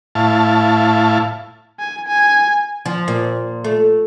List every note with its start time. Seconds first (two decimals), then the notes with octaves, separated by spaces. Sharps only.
0.15 A2 E4 F5 A5
1.80 G#5
2.08 G#5
2.86 F3
3.08 A#2
3.64 A3